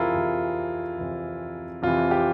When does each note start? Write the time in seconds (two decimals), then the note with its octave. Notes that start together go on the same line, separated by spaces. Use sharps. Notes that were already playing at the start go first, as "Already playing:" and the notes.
Already playing: F2 C3 E3 E4 F4 G#4 A#4
0.14 F2 C3 E3
0.98 F2 C3 E3
1.82 F2 C3 E3 F4
2.11 G4